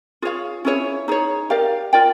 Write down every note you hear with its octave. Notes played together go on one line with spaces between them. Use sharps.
F4 G#4 C#5 F5
C#4 E4 G#4 C#5
D#4 G#4 C#5
G4 A#4 D5 F5
F4 A#4 D5 G5